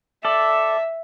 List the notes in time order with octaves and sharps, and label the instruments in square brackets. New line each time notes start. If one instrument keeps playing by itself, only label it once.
[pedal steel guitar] A4 D5 [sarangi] E5